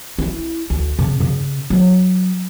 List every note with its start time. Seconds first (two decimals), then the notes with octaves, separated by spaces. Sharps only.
0.19 E4
0.70 D2
0.99 C#3
1.20 C#3
1.70 F#3